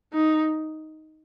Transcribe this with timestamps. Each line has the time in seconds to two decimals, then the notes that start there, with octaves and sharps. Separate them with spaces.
0.14 D#4